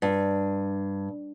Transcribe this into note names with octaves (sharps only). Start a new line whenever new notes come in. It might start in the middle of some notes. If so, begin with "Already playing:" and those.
G2